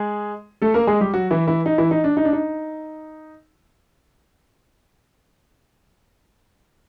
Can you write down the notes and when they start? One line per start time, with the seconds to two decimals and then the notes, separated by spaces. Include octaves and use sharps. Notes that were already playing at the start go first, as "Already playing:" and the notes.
Already playing: G#3 G#4
0.62 A3 A4
0.74 A#3 A#4
0.87 G#3 G#4
1.01 G3 G4
1.14 F#3 F#4
1.31 E3 E4
1.47 E3 E4
1.66 D#4
1.78 E3 E4
1.91 D#4
2.04 D4
2.17 D#4
2.25 D4
2.33 D#4